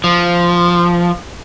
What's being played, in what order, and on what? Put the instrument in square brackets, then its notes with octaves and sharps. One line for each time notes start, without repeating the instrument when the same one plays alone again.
[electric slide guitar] F3